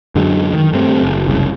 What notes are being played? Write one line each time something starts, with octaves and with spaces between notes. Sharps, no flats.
F#2 D3 F#3 G#3
D#3
G2 G3 A3 C4
F#1
F#1 C2 C#3